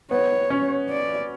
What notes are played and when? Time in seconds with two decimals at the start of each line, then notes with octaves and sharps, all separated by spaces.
0.11 B3 C#5
0.50 C#4
0.90 D5